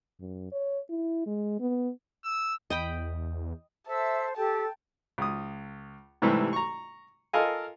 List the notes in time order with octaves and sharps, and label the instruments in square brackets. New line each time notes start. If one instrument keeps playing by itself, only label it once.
[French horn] F#2
C#5
E4
G#3
B3
[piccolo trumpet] E6
[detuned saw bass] E2 [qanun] D#5 G5 B5
[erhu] A4 [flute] C5 [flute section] E5 E6
[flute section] G4 [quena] A4 [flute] G5 [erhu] A5
[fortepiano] C#2 D#6
G#2 C3 E3 G3 A3
A#5 C#6
F4 A4 A#4 D#5 F5 G#5